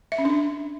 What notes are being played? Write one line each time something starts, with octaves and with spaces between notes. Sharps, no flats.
E5
C#4
D4